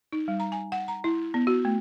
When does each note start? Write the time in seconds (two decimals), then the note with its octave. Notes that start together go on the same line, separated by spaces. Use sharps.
0.12 D#4
0.28 G3
0.40 A#5
0.52 G#5
0.72 F#5
0.88 A#5
1.04 E4
1.34 B3
1.47 F#4
1.65 A3